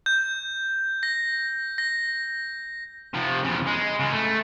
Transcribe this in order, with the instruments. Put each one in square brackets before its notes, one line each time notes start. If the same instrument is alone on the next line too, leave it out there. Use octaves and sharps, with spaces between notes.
[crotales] G6
A#6
A#6
[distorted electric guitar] C3 F3
E2 C#3
G#3
C#3 G#3
A3